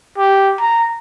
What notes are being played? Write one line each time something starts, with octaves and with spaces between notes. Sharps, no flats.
G4
A#5